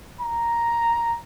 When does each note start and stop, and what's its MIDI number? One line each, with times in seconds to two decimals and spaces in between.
0.21 1.22 82